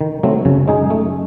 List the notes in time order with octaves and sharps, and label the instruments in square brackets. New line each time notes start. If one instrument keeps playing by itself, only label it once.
[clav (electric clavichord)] D#3
F#3 A3 C4
[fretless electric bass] F#2 [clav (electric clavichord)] C#3
[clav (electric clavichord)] G#3 D#4 G#4
A3